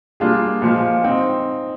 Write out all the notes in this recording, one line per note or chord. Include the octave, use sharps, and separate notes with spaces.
G3 A#3 D4 F4 G#4
A#2 F3 G#3
C4 D#4